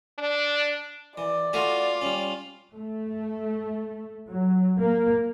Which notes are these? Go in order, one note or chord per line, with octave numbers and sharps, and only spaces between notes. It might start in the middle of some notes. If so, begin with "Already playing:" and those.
D4
E3 D5
A3 F4 F#4 G#5
G3 C#4
A3
F#3
A#3